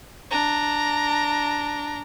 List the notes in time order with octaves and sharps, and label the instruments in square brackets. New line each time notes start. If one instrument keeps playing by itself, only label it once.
[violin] D4 A#5